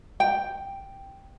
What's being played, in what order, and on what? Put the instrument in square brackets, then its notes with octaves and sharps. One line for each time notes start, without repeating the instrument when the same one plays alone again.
[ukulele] G5